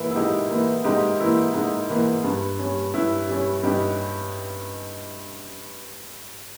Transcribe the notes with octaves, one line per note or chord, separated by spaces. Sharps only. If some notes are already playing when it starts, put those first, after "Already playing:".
Already playing: G#2 E3 A#3 E4
E4
G#2 D#4 G4
E3 A#3
G#2 D#4 G4
E3 A#3 E4
G#2 D#4
E3 A#3
G2
G3 C#4
G2 E4
G3 C#4
G2 D#4 G4